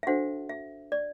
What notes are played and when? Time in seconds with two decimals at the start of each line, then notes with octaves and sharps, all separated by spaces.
0.03 E5
0.07 D4 F#4 A4 C5 F#5
0.49 E5
0.92 D5